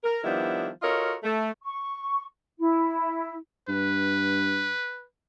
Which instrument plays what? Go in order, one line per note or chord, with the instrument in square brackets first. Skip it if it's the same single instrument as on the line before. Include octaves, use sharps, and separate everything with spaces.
[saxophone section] A#4
D#3 F3 G3 B3 D4 E4
F4 F#4 A4 A#4 C#5 D#5
A3
[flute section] C#6
E4
[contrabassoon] G2 [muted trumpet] B4